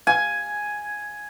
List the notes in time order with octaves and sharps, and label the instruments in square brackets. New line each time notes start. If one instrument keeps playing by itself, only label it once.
[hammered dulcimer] G#5